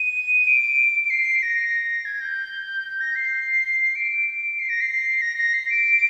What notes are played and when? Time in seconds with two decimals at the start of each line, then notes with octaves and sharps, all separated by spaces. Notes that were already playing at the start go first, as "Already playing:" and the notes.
Already playing: D#7
0.47 D7
1.04 D7
1.10 C7
1.43 A#6
2.05 G#6
2.21 G6
3.01 A#6
3.16 C7
3.95 D7
4.59 C7
4.69 A#6
4.81 C7
5.21 A#6
5.38 A#6
5.54 C7
5.70 D7